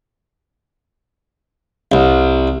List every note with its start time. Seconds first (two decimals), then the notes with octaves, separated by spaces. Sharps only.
1.92 C2